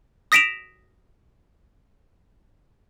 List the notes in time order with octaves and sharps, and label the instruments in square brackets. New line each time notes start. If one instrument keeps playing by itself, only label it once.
[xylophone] D#6 A#6 B6 D7 E7 F7